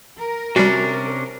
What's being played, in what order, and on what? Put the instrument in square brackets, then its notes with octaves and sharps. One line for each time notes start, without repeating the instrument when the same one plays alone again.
[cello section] A#4
[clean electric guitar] C3 C#4 D4 [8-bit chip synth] G3 F#4